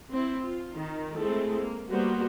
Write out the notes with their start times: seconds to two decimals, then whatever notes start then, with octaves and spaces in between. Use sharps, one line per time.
0.12 C4 E4
0.44 F4
0.76 D#3
1.16 G#3 A3 C4 E4 G#4 A4
1.59 A#3
1.89 G3 A#3 B3 F#4 C5